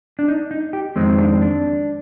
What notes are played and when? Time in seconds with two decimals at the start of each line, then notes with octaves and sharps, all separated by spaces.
0.19 D4
0.28 D#4
0.51 D#4
0.73 G4
0.96 F2 D#3 G#3 C4 D#4
1.19 D4
1.42 D4